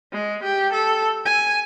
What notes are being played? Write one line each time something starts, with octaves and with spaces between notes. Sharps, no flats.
G#3
G4
A4
G#5